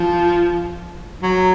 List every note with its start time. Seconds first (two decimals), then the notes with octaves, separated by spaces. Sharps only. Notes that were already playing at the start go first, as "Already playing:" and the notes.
Already playing: F3
1.22 F#3